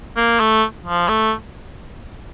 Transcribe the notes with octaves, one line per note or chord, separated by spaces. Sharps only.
A#3
A3
F3
A3